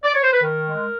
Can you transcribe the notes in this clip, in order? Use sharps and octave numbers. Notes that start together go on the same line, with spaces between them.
D5
C#5
C5
B4
D#3 A#4
G#3